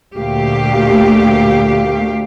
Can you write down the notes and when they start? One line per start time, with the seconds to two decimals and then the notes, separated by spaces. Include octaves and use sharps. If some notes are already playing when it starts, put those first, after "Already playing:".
0.16 D2 A#2 A3 G4 F5